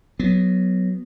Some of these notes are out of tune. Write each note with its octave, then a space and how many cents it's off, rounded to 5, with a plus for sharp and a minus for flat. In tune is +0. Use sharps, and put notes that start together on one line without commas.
F#3 +0 B3 +0